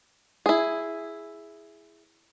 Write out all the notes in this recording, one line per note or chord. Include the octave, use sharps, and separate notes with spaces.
E4 G#4